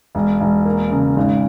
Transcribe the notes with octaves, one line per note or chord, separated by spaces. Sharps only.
E1
E1
A#3
C#3
G#1